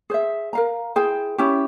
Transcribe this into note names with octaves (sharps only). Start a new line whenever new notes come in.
G#4 C5 E5
A#4 F5 A#5
E4 G#4 C5 G5
C#4 E4 G4